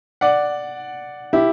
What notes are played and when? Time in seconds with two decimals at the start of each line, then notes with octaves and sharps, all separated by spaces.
0.21 D5 F#5
1.33 E4 G4